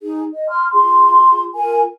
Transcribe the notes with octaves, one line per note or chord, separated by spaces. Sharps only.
D#4 G#4
D#5
C6 F6
F4 G#4 C6
F4 A#4 G#5